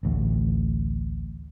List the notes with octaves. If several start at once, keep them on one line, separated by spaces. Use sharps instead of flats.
A1 D2